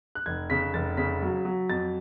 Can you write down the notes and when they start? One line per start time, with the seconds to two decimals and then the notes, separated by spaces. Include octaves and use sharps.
0.15 F#6
0.26 F1 G#6
0.50 C#3 B6
0.74 F1 A6
0.97 C#3 B6
1.22 F#3
1.45 F#3
1.70 F2 A6